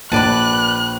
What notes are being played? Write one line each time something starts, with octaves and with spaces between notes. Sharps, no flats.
A#1 A#3 B4 D5 A5 F#6 D#7